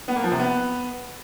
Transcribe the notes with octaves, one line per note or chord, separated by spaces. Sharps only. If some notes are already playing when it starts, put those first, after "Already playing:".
B3
A#3
F3
C3
B3